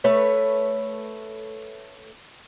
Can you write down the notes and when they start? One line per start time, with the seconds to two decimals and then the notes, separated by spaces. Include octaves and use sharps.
0.04 A3 B4 C#5